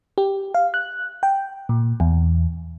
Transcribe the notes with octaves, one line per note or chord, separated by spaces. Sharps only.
G4
F5
F#6
G5
A#2
E2